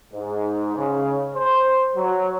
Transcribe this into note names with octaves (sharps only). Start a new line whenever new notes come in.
G#2
C#3
C5
F#3